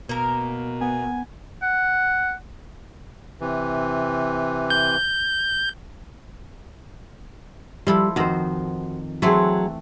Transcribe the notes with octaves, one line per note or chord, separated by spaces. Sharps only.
B2 A#3 A#4
B3 G#5
F#5
C3 E3
G6
F3 G3 E4 A4
F2 D#3 F#4 C5
E3 F#3 A3 C4 G#4